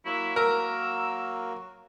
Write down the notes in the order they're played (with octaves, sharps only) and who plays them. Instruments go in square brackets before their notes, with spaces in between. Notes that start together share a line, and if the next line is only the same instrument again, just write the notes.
[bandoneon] F#3 A#3 F#4 [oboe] E4
[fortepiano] A#4 [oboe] E6